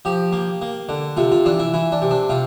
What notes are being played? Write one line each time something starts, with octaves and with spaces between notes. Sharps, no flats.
F3 G4
A#3
A#3
D3
C3 F4
F4
E3 D4
E4
E3 E4
D4
C3
D4
C3 F4